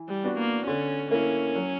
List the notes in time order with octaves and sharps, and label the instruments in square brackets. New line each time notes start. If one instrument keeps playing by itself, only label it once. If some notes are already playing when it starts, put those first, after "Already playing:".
Already playing: [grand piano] E3
[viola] G3
[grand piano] B3 D4 F#4
[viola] A#3
[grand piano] D3 [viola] C#4
[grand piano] A#3 E4 [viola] C#4
[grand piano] F#3